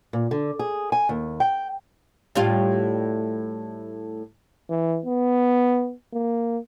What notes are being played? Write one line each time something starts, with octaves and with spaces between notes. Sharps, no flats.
A#2
D3
G#4
G#5
D#2
G5
A2 G3 F4
E3
B3
A#3